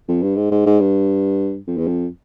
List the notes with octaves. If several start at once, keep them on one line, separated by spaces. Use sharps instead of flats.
F2
G2
G#2
G#2
G#2
G2
F2
E2
F2